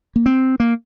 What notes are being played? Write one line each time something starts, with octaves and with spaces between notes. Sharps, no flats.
A#3
C4
A#3